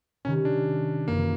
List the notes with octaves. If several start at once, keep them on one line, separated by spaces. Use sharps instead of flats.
C3 D#3 G3 C#4
D4
F#1 F#2 C#3 E3 A#3